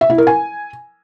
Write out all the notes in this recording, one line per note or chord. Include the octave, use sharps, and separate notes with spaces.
E5
E4
A#4
G#5